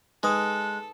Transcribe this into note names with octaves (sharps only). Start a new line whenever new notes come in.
G#3 D#4 A4 B4 D#6 F#6